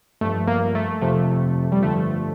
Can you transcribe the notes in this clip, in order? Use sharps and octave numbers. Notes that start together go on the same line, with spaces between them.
G2 F3 A3
A#3
A3
F2 C3 F3 A3
G3
G2 D3 F3 A3